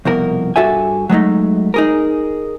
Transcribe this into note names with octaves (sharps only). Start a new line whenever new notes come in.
C2 F2 B2 A#4
G2 F#4 A4 E5 G#5
F#3 G#3 A3 D#4
D#4 G#4 A#4